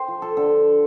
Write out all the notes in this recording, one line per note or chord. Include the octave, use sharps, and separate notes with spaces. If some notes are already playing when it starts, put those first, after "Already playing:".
Already playing: C5 G5
F3
F3 A4
D3 A4